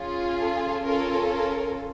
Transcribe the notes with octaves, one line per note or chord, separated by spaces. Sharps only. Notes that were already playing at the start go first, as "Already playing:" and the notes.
Already playing: C#4 F4 G#4
A4
C#4 F4 A4 A#4
A#4